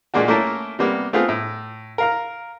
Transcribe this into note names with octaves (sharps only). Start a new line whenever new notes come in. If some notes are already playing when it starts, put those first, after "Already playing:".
A#2 G#3 A#3 D4 F#4
A3 A#3 C#4 E4 A#4 A5
C3 G3 A#3 B3
A3 B3 C4 F4 G#4
A2
A#4 F5 A#5